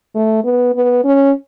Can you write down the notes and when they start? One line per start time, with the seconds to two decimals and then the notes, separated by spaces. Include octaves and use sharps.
0.15 A3
0.45 B3
0.75 B3
1.05 C#4